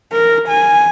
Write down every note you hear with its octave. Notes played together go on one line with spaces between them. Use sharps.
A#4
G#5